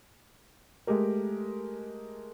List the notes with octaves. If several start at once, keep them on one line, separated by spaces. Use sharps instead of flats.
G#3 A3 G4 A#4